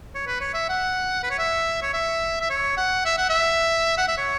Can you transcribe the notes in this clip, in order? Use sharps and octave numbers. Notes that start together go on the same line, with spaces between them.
C#5
B4
C#5
E5
F#5
B4
C#5
E5
C#5
E5
E5
C#5
F#5
E5
F#5
E5
F#5
E5
C#5